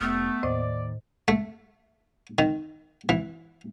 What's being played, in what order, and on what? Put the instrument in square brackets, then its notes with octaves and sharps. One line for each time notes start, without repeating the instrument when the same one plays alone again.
[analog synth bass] F1 [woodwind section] A3 [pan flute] B3 [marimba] F6
[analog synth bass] D#2 [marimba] A2 C5 D#5 [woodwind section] D5
[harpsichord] A3
D#3
E3